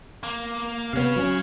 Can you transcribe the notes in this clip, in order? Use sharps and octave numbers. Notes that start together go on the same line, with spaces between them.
A#3
C3 B3 C#5 F5
F#3 C#4